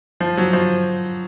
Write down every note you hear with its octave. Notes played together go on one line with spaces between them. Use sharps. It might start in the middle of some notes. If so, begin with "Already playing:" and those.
F3
F#3
F3